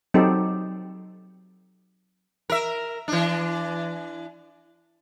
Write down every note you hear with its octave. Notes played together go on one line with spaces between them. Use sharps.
F#3 C4 D#4 G4 A4
A#4 E5
E3 D4